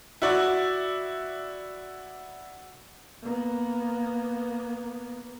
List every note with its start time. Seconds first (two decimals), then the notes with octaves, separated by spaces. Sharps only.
0.22 E4 F#4 D5
3.22 A#3 B3